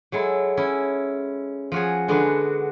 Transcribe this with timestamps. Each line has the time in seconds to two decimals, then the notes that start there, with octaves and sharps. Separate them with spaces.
0.12 F#3 G#3 E4 A4
0.57 C#4 E4 D#5
1.72 F3 F#4 G#4
2.08 D3 G#3 B3 D4 F#4